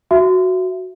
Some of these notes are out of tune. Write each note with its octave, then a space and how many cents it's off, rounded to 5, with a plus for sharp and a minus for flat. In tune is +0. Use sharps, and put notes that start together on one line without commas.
F#4 +0 E5 +25